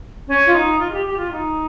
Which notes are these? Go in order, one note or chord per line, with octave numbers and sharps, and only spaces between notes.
C#4
F4
D#4
F4
G#4
G4
G4
F4
D#4